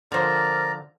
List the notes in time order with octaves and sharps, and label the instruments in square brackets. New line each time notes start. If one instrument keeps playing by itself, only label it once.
[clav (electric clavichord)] D3 F3 [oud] A#4 C5 [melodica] D5 A#5 [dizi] F6